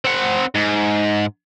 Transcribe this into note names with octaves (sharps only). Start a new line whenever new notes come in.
C4 F#5
G#2